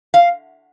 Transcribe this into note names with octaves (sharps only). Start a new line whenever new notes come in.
F5